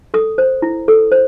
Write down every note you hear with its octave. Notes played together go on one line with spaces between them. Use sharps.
A4 D#6
C5
E4
A4
C5